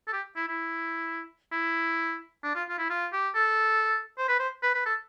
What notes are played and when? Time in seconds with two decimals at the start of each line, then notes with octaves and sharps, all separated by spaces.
0.08 A4
0.13 G4
0.36 E4
0.48 E4
1.52 E4
2.44 D4
2.55 F4
2.69 F4
2.78 E4
2.90 F4
3.13 G4
3.35 A4
4.18 C5
4.28 B4
4.39 C5
4.62 B4
4.74 B4
4.85 A4